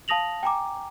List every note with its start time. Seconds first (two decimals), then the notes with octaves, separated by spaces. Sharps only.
0.08 F5 A5 D#6 A#6 F7 F#7
0.43 G5 G#5 A#5 D6